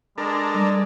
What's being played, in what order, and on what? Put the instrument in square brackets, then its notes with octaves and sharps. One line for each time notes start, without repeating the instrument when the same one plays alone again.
[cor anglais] G#3 [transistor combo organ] D4 A4 A#4
[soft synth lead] G3 [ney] D5